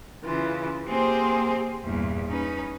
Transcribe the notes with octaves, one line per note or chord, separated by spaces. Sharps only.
C#3 E3 F4
A#3 C4 G4 G#4 C5
E2 G2 A#2
C#4 D#4 B4